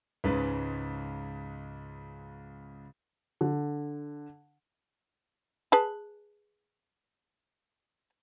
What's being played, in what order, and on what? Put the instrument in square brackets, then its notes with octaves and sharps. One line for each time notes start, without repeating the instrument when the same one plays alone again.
[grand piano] C#2 G#2 C#3 B4
[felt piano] D3
[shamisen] G#4 B4 A5